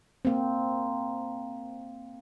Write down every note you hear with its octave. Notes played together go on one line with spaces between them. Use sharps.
A#3 C4